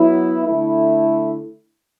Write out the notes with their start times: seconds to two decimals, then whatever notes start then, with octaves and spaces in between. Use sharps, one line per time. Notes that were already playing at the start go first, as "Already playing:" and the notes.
Already playing: F#3 B3 E4
0.46 D3 A3 E4